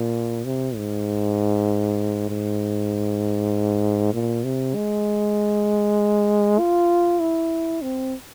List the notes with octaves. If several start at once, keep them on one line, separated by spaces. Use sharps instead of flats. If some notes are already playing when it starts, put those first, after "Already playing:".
Already playing: A#2
C3
G#2
G#2
A#2
C3
G#3
F4
E4
C4